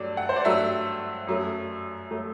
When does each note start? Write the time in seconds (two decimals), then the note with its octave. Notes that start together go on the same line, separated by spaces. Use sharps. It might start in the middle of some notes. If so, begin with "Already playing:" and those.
Already playing: G2 F#3 A3 D5
0.17 F#5
0.29 C5
0.36 D5
0.45 G2 F#3 A3 E5
1.27 F#2 F#3 A3
2.11 F#3 A3